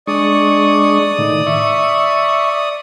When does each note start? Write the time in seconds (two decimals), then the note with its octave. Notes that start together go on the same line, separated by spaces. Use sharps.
0.07 G#3 D4 D5 C#6 D#6
1.19 A2 D#3
1.47 E5 C#6